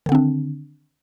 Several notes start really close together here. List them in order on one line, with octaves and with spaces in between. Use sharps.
D#3 D3 C4 D4